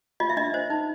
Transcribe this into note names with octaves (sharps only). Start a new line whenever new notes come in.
F4 D#5
E5
D4 D#5
C5
D#4